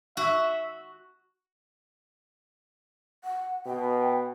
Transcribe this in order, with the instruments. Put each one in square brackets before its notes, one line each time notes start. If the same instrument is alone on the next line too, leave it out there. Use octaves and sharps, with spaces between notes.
[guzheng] F#4 [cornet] E5
[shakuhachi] F#5
[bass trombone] B2 [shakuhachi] G5